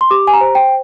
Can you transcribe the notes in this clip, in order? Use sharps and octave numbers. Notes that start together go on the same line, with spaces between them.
C6
G4 D6
G#5
A#5
C5
G5